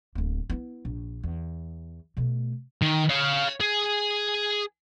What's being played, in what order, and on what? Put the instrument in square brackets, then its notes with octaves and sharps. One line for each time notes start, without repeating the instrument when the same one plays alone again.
[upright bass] D1 A#3
B3 E4
A#1
E2
B2 A3
[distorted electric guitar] D#3
C#5 F5
G#4